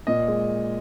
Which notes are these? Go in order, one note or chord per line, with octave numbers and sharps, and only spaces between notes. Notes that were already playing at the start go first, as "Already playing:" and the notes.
A#2 D#5
G#3